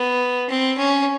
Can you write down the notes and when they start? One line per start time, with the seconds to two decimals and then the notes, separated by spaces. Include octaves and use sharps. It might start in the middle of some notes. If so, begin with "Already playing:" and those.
Already playing: B3
0.50 C4
0.78 C#4